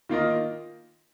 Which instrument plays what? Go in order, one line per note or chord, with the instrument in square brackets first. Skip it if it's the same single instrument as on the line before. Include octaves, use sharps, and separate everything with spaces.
[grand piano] D#3 A#3 F4 A#4 D#5